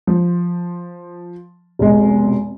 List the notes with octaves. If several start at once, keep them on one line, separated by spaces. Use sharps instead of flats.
F3
F1 B1 G#3